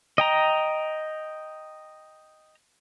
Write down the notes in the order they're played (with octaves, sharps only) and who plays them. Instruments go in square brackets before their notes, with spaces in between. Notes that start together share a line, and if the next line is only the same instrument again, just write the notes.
[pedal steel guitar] D#5 G5 A#5